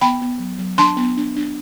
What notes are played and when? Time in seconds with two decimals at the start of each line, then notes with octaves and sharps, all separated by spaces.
0.01 B3 G5 B5
0.21 B3
0.39 F#3
0.59 F#3
0.78 D4 A5 C6
0.97 B3
1.17 D4
1.36 D4